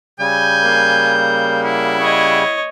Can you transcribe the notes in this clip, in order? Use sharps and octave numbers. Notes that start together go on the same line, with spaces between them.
C#3 G3 G#5 G6
A#3
E4 F#5
C#5 D#5